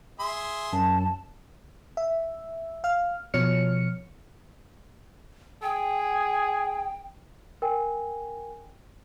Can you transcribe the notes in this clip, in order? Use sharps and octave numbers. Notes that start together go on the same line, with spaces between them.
G#4 E5 C6
F#2 A5
E5
F5 F6
B2 F3 C#5 F6 C#7
G#4 G5
A#4 G5 G#5